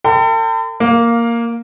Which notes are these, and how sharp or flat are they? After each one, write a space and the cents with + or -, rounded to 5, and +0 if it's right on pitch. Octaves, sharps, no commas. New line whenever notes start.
A4 +40 G5 +5 B5 +45
A#3 +0 F5 +15